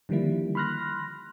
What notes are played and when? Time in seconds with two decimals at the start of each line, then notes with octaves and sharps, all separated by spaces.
0.09 D3 D#3 F3 G3 A#3 E4
0.55 B5 C6 F6 F#6 A#6